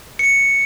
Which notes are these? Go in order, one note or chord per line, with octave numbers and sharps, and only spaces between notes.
C#7